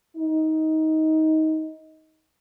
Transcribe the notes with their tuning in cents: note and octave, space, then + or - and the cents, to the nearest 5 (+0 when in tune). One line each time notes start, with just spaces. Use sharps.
D#4 +20